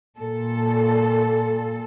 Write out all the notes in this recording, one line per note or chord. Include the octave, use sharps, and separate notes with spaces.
A#2 A4